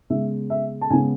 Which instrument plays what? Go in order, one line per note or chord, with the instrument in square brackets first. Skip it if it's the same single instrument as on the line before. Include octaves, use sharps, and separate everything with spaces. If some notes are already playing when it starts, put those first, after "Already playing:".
[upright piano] C#3 G#3 B3 E5
E5
A5
C#3 G#3 B3 G#5